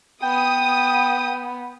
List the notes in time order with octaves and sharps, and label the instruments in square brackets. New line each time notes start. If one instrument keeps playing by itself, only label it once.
[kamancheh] B3 [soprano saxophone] G5 [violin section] D#6